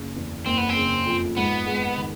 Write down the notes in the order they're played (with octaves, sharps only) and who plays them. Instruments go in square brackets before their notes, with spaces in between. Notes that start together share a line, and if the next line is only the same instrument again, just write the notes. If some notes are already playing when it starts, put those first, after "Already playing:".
Already playing: [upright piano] F#1 C#3
E2
[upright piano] F#1 [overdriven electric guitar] C4
[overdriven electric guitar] B3
C4
[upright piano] C#3
F2
[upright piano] G#2 [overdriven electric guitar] B3
[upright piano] G#3
D#3